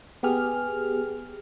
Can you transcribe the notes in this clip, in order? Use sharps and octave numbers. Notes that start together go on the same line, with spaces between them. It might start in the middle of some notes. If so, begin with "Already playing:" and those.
B3 G4 G#4 F6